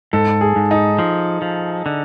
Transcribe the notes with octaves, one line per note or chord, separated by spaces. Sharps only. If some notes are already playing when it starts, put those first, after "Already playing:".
G#2 A4
G#4
G#2
D#4
F3
F3
D3